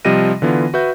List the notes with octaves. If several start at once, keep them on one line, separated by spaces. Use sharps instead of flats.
C3 F3 G3 D#5 A#6 D#7
D3 E3 B3 F4
F#4 B4 E5 G6